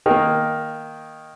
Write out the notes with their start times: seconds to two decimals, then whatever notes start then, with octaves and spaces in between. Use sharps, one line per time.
0.06 D#3 A#3